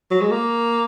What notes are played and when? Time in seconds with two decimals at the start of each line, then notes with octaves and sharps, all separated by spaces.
0.11 F#3
0.21 G#3
0.31 A#3